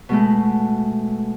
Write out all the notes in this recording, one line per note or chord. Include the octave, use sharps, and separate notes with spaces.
B2 G#3 A3